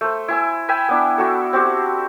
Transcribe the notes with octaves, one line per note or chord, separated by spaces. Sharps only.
A3 C5
E4 G#5 E6
E5 G5 G#5 B5
B3 D4 E4
E4 F#4 A4
C4 F#4 G4 C5